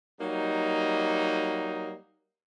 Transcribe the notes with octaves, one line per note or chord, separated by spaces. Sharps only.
F#3 G3 A#3 D#4